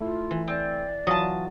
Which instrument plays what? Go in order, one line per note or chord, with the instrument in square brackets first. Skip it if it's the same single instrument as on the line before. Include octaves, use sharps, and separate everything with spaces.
[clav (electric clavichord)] A3 E4 [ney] F4
[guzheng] E3
[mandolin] C4 [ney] D5
[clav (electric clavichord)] E3 F4 F#4 [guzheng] F#3 [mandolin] A5 D#6